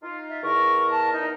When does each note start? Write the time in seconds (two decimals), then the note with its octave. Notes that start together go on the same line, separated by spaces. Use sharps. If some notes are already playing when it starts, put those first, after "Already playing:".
0.03 D#4 F4
0.30 E5
0.43 E2 A#4 C#6
0.90 A5
1.13 D#4